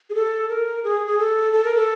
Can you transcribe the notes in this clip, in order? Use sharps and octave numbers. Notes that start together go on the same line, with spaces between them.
G#4
A4
A#4
G#4
G#4
A4
A4
A#4
A4